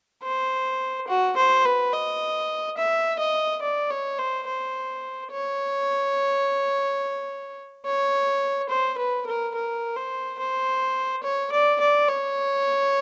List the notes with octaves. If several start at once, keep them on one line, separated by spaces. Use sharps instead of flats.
C5
F#4
C5
B4
D#5
E5
D#5
D5
C#5
C5
C5
C#5
C#5
C5
B4
A#4
A#4
C5
C5
C#5
D5
D5
C#5